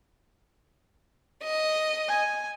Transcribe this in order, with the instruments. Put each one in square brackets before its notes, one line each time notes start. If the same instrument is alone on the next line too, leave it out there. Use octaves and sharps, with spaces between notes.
[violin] D#5
[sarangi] G#5